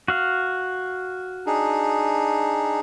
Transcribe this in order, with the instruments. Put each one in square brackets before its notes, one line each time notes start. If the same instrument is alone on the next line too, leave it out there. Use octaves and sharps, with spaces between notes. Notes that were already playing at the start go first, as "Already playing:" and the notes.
[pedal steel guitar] F#4 F5
[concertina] D4 D#4 G#4